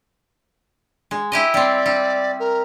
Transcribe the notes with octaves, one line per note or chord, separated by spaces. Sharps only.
G#3
E4 G4 D#5
G3 C4 D5
G3
A#4